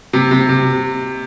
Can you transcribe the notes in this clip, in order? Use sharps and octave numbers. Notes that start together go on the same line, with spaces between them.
C3
C3
C3